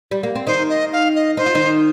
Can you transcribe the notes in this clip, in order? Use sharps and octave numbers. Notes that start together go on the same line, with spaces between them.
G3
A#3
C4
D#3 D#4 C5
D#5
F5
D#5
D#4 C5
F4
D#3 D#4